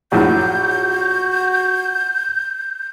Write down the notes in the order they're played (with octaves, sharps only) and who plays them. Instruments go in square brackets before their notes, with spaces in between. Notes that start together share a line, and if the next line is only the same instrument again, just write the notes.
[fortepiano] A#1 F#2 A2 [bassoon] F#4 [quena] G6